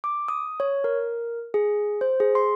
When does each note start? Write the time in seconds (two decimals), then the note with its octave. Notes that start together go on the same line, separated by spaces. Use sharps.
0.04 D6
0.28 D#6
0.60 C#5
0.84 A#4
1.54 G#4
2.01 C5
2.20 G#4
2.35 C6